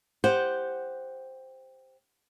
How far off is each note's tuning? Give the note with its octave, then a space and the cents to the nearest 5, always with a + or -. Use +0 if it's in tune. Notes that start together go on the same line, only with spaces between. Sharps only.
G4 +10 C5 +0 F#5 +0